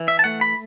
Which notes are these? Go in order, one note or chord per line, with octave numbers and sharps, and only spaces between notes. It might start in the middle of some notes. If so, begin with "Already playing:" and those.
Already playing: E3
E5
A5
A3 F#5
B5